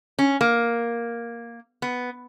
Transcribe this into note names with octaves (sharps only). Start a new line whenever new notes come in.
C#4
A#3
B3